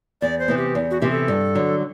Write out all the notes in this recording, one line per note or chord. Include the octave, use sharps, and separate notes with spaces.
E2 D5
C5
C3 E3 B3
G4
E2
F#4
C3 E3 B3 G4
A4
G2
D3 F#3